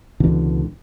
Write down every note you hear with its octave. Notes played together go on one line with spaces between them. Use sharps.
C#2 B2 D3 E3